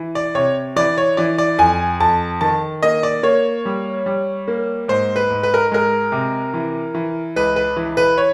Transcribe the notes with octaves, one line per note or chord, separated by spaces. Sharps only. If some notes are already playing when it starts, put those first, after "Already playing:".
Already playing: E3
D5
C3 C#5
E3 D5
C#5
E3 D5
D5
F2 G#5
F2 A5
D#3 A5
A#3 D#5
D5
A#3 C#5
G3
G3
A#3
G#2 C5
B4
G#2
B4
A#4
G#3 A#4
C3
E3
E3
C#2 B4
B4
E3
B4
C#5